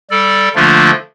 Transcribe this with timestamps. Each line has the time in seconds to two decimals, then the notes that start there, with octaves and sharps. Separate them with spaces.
0.11 G3 A4 D5
0.56 D3 F3 A3 A#3 D4 F4